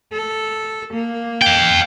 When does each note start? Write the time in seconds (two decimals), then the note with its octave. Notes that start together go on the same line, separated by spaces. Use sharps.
0.12 A4
0.93 A#3
1.42 F5 G5